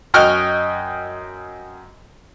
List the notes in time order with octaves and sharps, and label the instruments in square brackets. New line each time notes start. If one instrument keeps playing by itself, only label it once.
[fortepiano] F#2 D#5 G5 C#6 F6 F#6